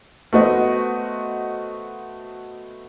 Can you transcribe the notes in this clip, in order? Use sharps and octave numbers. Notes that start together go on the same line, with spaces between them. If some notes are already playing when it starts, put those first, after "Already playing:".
A3 B3 F#4 C5 D#5